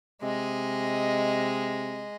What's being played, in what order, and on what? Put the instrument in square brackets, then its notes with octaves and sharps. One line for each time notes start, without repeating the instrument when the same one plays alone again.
[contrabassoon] C3 [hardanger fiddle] G#3 D#5